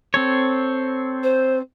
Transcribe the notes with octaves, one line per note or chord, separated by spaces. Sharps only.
C4 A4 C#5
C5